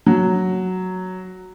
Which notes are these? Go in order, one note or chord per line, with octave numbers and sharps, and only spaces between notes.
F#3